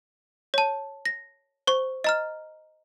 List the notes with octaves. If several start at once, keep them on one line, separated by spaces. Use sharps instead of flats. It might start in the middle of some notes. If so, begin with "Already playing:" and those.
C#5 A5
A#6
C5 C#6
D#5 A#5 F6